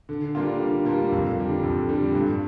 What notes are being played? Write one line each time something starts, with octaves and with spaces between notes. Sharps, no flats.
D3
G3 A#3 D4 F4
D3
G3 A#3 D4 F4
F2
D3 G3 D4
F2
D3 G3 D4
G2